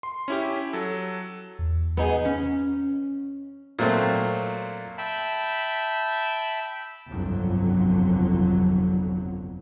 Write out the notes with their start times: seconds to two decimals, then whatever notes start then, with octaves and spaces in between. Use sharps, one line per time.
0.03 C6
0.28 C#4 E4 G4
0.73 F#3 A4
1.59 E2
1.97 B3 D#4 G#4
2.25 C#4
3.79 A#2 F#3 A3 C4
4.98 E5 G5 A5 B5
7.09 G1 C2 F2 D3 F#3